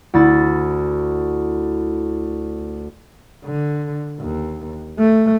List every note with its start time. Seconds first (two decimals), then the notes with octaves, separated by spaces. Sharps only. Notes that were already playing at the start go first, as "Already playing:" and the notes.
0.14 D2 E4 A6
3.45 D3
4.19 D#2
4.98 A3